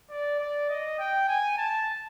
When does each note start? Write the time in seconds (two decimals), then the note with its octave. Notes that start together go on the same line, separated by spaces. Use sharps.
0.10 D5
0.39 D5
0.69 D#5
0.99 G5
1.28 G#5
1.58 A5